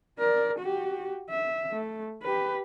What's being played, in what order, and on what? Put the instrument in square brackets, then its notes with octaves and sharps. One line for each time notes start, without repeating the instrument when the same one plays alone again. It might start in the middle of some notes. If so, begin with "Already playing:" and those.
[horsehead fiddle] A#4 D5
F#4 G4
E5
A3
G4 B4